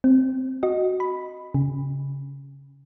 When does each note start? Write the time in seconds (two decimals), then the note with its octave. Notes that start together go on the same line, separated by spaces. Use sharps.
0.04 C4
0.63 F#4 D#5
1.00 B5
1.54 C#3